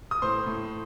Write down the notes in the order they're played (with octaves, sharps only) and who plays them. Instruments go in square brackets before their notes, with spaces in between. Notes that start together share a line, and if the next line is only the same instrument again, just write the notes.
[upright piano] D#6
A2 C5 C6
A2